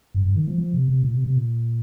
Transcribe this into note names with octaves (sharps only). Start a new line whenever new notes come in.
G2
G2
D#3
F3
F3
C3
C3
A#2
C3
C3
A#2